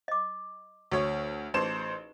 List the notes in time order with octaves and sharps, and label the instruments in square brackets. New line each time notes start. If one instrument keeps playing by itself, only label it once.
[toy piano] D#5 D6
[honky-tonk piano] D2 C#5 [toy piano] F#4 A4 C#6
[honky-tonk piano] A1 C5 E7 [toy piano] D#4 G#4 B4